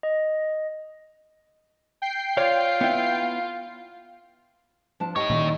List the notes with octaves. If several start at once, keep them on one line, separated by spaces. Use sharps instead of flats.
D#5
G5 C7
F4 C#5 D5 F5
B3 E4
F3 D4 A5
D#4 E4 G4 C#5 G5
A#2 D#3